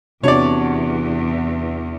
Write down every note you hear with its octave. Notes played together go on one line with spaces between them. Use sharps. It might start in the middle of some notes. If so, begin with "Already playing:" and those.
E2 C3 D4 F#4 C#5 D5